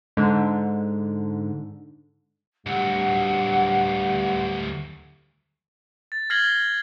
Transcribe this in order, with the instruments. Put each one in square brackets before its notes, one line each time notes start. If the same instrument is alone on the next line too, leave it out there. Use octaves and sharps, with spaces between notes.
[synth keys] G#2 D3
[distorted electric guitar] D2 F#3 [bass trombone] G2 [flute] F#5
[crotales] A6
F6 G#6 A#6 C7 F#7 G7